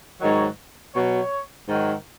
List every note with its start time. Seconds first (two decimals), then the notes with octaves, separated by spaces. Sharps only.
0.21 G#2 D#3 F#3 C#5
0.95 B2 F#3 C#5
1.68 G#2 D#3 F#3